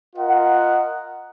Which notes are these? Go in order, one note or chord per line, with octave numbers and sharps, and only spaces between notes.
F4 A#4 D#5 F#5